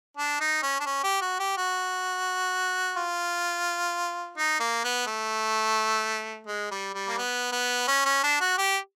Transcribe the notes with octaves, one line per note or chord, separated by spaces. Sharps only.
D4
D#4
C#4
D4
C#4
G4
F#4
G4
F#4
F4
D#4
A#3
B3
A3
G#3
G3
G3
A#3
B3
B3
C#4
C#4
D4
F#4
G4